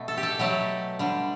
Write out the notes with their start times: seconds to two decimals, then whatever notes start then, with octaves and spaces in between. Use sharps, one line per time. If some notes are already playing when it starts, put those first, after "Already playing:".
Already playing: B2 A3
0.08 A4
0.18 G4
0.23 A4
0.39 B2 F#3 A3 G4
0.99 D3 G3